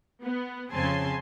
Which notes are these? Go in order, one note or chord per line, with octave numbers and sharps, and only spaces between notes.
B3
F2 C#3 C4 G#5 A5 C6